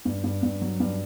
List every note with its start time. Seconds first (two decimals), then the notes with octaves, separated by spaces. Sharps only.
0.05 G2
0.24 G2
0.43 G2
0.61 F#3
0.80 G2